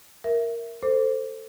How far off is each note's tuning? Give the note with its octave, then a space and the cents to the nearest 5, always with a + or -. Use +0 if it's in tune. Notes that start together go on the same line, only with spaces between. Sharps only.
A#4 +0 E5 +5
A4 +15 C5 +0 D6 -15